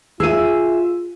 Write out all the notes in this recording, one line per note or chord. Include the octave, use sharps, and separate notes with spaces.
F4 G#4 E5 E6 D#7